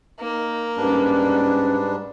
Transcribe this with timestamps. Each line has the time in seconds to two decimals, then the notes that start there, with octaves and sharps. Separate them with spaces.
0.20 A#3 D#4
0.77 G#2 G3 C#4 D4 B4